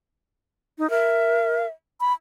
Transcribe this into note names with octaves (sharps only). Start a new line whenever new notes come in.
D#4
A#4 E5
B5